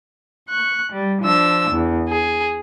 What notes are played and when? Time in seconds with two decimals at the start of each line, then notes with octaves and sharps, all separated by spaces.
0.48 C#6 F#6
0.92 G3
1.22 F3 D4 E6
1.71 E2
2.06 G#4